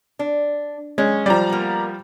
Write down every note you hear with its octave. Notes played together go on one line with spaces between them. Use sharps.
D4
G#3 C#4
F3 G3 D5 A#5
A#3 B3